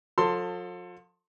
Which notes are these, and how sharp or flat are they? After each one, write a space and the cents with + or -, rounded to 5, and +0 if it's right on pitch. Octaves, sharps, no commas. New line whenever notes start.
F3 +45 A4 +20 C6 +0